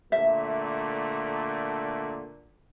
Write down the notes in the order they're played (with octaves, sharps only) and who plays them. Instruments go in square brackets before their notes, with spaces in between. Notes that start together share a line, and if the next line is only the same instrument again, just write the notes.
[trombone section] A#2 D3 A3 [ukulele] E5